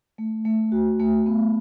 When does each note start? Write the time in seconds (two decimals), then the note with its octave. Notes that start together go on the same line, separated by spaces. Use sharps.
0.18 A3
0.45 A3
0.72 F#4
1.00 A3
1.26 B3